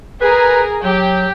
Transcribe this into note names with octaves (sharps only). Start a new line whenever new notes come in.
G#4 A#4 B4
F#3 G4 G5